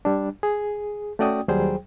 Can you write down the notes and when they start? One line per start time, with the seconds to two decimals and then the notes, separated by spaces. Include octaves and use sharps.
0.05 G3 D4
0.43 G#4
1.19 A3 C#4 F#4 D5 G5 D#6
1.48 D#2 F#3 G3 G#4 C5 G5